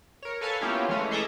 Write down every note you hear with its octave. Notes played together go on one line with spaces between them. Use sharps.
A#4 C#5
A4 B4 C#5 F5 G#5 A5
A#3 B3 C#4 E4 F4 G4
E3 G#3 A3 C#4
G#4 A4 D#5 E5 A#5 D6